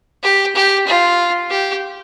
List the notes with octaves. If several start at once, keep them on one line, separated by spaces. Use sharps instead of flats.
G4
G4
F4
G4